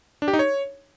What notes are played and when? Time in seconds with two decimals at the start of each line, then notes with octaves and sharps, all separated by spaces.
0.22 D4
0.28 G4
0.33 D#4
0.39 C#5